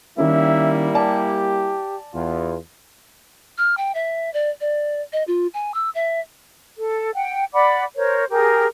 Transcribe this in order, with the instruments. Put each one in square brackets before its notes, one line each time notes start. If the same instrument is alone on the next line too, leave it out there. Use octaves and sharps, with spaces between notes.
[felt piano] D#3 C#4 [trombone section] G3 A#3 E4 [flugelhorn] E5
[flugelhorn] G4 [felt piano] D5 G#5 A5
[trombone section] E2 [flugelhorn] F4
[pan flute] F6
G5
E5
D5
D5
D#5
F4
G#5
E6
E5
[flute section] A4
F#5 G5
D5 F#5 B5 D6
A#4 C5 C#5
G4 G#4 A#4